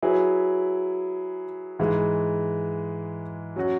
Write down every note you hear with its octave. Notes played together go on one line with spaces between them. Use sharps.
F#3 E4 G#4 B4
G#2 E3 G#3
F#3 C#4 F#4